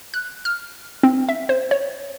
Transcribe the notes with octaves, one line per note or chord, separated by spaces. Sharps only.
F#6
F6
C4
E5
C5
C#5